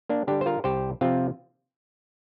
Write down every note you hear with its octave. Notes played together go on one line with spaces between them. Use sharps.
A#3 D4
D3 G3 D4 G4
C5
F4 A#4
C2 G4 C5
C3 F3 C4 F4